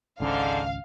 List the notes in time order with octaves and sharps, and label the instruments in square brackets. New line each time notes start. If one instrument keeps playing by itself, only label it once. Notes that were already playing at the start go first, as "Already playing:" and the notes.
[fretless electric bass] G#1 C#2 C#4 [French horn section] G#2 D3 [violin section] F5